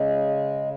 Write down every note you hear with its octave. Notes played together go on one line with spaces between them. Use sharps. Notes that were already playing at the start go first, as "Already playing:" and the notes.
Already playing: C#3 G#3